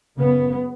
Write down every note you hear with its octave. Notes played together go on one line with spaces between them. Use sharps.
F#2 C#3 B3